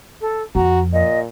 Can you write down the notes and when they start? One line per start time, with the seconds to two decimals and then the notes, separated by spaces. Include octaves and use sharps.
0.21 A4
0.55 F2 F#4 A#5
0.93 A#2 D#5